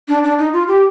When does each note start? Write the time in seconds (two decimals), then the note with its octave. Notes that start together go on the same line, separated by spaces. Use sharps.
0.08 D4
0.24 D4
0.39 D#4
0.53 F4
0.68 G4